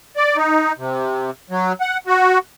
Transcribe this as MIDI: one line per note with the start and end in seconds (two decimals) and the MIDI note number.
0.17 0.37 74
0.37 0.72 63
0.78 1.31 48
1.50 1.73 54
1.81 1.98 78
2.07 2.38 66